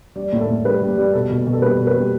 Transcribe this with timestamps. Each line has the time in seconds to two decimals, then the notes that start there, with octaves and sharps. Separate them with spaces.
0.16 G3 D5
0.32 A2
0.40 A4
0.49 A2
0.65 G3 B4
0.82 G3
0.89 D5
0.97 G3
1.13 B2 A4
1.30 B2
1.47 B2
1.53 A4
1.62 G3 B4
1.79 B2
1.87 B4
1.96 G3